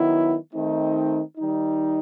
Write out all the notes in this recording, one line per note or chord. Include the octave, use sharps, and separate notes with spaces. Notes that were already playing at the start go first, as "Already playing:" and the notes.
Already playing: D#3 F#3 B3 E4
D#3 A3 C4 D#4
D#3 G3 D#4